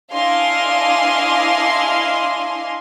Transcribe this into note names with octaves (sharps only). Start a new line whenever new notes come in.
D4 E4 D#5 F5 G#5 C6